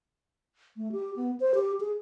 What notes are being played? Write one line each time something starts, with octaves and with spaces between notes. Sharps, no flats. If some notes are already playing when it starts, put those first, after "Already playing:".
A3
G4
B3
C5
G4
G#4